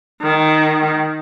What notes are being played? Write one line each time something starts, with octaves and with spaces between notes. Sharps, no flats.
D#3